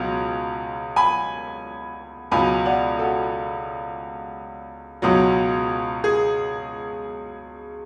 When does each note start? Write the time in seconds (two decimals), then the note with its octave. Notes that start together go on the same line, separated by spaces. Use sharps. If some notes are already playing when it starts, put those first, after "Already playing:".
Already playing: C#2 B2 F#3
0.96 G#5 B5
2.31 C#2 B2 F#3 G#5 B5
2.65 D5 F#5
2.99 F#4 A4
5.02 C#2 B2 F#3
6.04 G#4